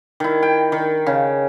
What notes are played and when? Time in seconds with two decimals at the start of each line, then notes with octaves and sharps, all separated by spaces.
0.20 D#3 E4
0.43 G5
0.72 D#3
1.06 C#3